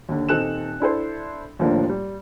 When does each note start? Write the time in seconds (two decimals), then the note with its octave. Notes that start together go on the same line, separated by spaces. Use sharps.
0.09 D#2 D3
0.29 D#1 C4 D#4 A4 F#6 E7
0.80 D4 E4 A4 C5
1.59 D#2 A2 D3 F3 A#3 D4
1.89 G3